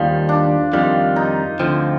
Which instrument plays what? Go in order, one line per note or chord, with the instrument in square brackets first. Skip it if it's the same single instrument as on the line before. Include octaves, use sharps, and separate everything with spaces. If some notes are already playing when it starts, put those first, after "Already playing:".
Already playing: [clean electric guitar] D#2 D#3 G3 [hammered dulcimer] F3
[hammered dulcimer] D4
[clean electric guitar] F2 D#3 G3 [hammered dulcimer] F4
[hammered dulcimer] D#4
[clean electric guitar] D2 D3 F3 [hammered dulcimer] C4